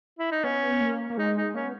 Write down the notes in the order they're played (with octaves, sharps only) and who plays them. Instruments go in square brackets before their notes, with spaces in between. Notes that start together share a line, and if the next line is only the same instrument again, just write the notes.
[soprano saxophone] E4
D#4
[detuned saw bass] B3 [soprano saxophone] C#4
[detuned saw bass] A#3
A#3
[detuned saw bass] G#3 [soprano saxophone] D#4
[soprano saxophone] D#4
[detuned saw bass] A#3 [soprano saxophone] C#4
[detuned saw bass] B3